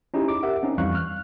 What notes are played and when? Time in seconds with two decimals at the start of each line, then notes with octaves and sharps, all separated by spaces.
0.14 C#4 D#4 E4 G4 G#4
0.28 D6
0.43 G4 A#4 E5 F#5
0.63 C4 C#4 D#4
0.78 F2 E3 G3 F5 C#6 F#6
0.95 F6 F#6